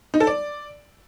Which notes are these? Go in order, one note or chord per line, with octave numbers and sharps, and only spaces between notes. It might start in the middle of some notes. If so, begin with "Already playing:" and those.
D#4
A4
D5